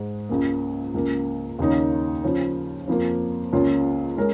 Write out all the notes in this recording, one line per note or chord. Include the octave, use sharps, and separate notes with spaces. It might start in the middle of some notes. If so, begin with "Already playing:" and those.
Already playing: G#2 G#3
C#2 C#3 A#3
C#2 C#3 A#3
D#2 C#3 A#3 D#4 C#5
C#3 F3 C#4
F2 F3 A#3
C#2 C#3 A#3 F4 C#5
G#3 C#4 A#4